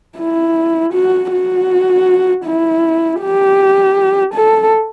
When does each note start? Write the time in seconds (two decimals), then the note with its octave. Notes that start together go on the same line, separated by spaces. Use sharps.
0.18 E4
0.93 F#4
1.32 F#4
2.45 E4
3.21 G4
4.34 A4